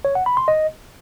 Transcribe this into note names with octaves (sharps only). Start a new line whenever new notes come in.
C#5
F#5
B5
C6
D#5